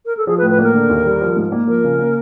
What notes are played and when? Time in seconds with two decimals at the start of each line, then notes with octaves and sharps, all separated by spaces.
0.06 A#4
0.17 A4
0.27 F3 G#4
0.38 B4
0.42 A2
0.50 B4
0.59 A#3 A#4
0.74 D3
0.90 D#2
1.05 G3
1.21 F3
1.37 G#2
1.52 A#3
1.67 F3 A#4
1.84 C#3
1.99 A#3